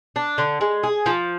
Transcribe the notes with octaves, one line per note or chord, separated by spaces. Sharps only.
D4
D3
G#3
G#4
F3